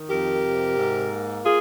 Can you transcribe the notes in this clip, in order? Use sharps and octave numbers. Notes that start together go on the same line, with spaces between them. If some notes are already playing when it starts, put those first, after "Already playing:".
Already playing: D#3
F2 G4 A#4
C3
G#2
A#3
F4 G#4